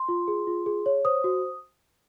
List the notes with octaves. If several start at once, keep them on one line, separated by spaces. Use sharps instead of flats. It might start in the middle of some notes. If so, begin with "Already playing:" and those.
Already playing: C6
F4
G#4
F4
G#4
C#5
C5 D#6
F#4